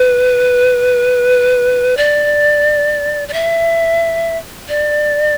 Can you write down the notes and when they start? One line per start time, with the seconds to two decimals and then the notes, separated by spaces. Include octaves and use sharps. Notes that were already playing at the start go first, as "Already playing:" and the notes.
Already playing: B4
1.97 D5
3.28 D5
3.33 E5
4.69 D5